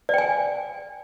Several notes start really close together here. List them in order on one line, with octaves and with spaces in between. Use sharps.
D5 G5 G#5